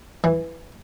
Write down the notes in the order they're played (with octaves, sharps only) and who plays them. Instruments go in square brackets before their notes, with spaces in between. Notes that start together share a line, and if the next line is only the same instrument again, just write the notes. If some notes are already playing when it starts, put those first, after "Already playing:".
[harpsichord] E3